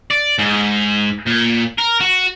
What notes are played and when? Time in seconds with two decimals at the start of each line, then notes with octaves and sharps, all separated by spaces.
0.11 D5
0.39 G#2
1.27 A#2
1.78 A#4
2.00 F#4